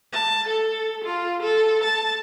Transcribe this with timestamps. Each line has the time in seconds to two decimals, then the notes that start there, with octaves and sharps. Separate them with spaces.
0.13 A5
0.48 A4
1.04 F4
1.42 A4
1.84 A5